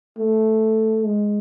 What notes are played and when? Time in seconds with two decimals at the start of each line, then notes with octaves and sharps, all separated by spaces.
0.18 A3
1.06 G#3